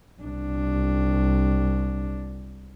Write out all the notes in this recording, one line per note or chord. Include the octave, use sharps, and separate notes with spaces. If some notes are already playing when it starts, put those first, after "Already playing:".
C2 D4